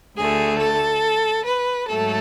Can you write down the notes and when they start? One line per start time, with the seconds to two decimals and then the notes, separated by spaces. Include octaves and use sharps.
0.17 D2 D3 A3 G#4
0.59 A4
1.45 B4
1.88 G#2 F#3 A3 A4